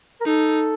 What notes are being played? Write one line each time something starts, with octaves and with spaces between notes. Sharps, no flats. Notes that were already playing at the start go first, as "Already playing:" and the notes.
A#4
D#4 A4